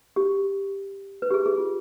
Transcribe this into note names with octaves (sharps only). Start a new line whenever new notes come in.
G4
B4
G4
G#4
G#4
F4